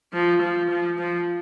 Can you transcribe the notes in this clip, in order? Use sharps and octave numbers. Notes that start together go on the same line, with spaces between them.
F3
F3
F3
F3